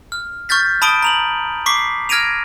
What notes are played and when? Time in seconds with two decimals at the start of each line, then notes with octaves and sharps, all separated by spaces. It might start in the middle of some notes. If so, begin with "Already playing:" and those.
0.12 F6
0.49 C#6 F6 G6 A6 B6
0.82 A5 B5 D#6 D7 D#7 G7
1.02 A#5 F7 F#7
1.66 C#6 D6 B6 C7
2.09 F6 G#6 A#6 D7 D#7 F7